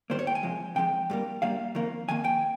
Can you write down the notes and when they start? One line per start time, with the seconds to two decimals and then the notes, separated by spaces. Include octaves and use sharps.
0.10 G#2 D#3 G3 A#3 C5
0.19 C#5
0.27 G5
0.35 G#5
0.43 C3 F3 G#3
0.76 C3 F3 G#3 G5
1.10 G2 G3 A#3
1.42 G2 G3 A#3 F5
1.75 F2 D#3 A#3
2.08 F2 D#3 A#3 G#5
2.24 G5